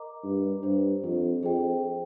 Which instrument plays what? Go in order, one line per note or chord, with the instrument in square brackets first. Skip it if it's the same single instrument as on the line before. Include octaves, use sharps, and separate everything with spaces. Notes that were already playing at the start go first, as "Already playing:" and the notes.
Already playing: [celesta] A#4 D#5 A#5 D6
[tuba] G2
[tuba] G2 [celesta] D4 G4 C5
[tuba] F2
[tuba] F2 [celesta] G#4 C5 D#5 G5